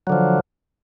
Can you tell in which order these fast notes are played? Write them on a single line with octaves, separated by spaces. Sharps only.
F#3 D3 F3